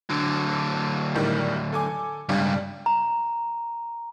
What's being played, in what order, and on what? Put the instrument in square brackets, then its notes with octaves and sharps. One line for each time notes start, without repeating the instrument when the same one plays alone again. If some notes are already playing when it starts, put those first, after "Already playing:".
[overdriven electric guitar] D3 F#3
[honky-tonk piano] A2 D#3 G3
A4 G#5 D6
[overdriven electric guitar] C#2 G2 [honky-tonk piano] G3 D4
[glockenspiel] A#5